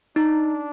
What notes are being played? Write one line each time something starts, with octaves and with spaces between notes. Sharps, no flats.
D4 D#4